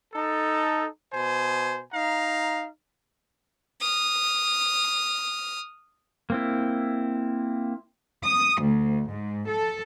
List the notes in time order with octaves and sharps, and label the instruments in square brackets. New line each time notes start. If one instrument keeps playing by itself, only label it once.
[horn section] D#4 A4
B2 C5 G#5
D#4 F5 A#5
[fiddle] D#6 F6
[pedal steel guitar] A#3 C4 E4
[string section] D#6
D2
G#2
A4